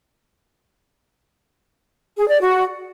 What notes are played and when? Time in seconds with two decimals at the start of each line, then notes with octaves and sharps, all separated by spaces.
2.18 G#4
2.29 D5
2.39 F#4